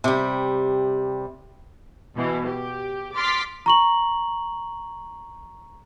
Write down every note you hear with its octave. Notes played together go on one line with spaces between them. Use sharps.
C3 G3
B2 E3
G4
C6 D6 F6 A6 B6
A#5 C#6 F#7